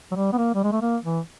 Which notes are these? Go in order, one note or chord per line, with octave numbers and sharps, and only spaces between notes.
F#3
G3
B3
A#3
G3
G#3
A3
A#3
E3